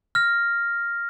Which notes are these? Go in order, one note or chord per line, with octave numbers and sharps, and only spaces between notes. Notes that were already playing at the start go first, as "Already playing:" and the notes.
F6 A#6